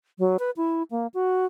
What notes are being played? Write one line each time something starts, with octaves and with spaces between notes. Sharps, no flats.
F#3
B4
E4
A#3
F#4